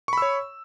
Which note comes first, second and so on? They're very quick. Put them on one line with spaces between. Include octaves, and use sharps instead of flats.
C#6 B5 E6 C#5